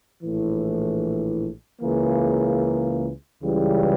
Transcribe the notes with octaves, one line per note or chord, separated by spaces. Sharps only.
A#1 A2 E3
C#2 C#3 E3 A#3
C#2 C#3 E3 G3